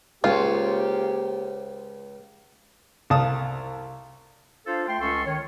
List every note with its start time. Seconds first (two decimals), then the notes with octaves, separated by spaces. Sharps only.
0.24 C#2 A#3 F4 G4 G#4 C5 C#5
3.10 C2 F5 A5 D#6
4.66 D4 F4 A4 C5 F5
4.87 A3 G5 C6
5.00 C#2 C#4 A4 C6 C#6
5.26 D#3 C#5